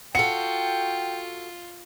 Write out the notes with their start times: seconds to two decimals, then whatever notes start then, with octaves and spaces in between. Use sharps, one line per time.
0.15 F4 F#4 A4 G5 C#7